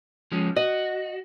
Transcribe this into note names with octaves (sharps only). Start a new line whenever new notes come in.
F3 G#3 C#4
F#4 D#5